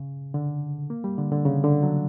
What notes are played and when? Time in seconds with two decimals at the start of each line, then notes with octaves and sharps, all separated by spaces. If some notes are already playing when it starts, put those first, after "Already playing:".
Already playing: C#3
0.34 D3
0.90 A#3
1.04 G3
1.18 D3
1.32 D3
1.45 C#3
1.64 D3
1.83 F#3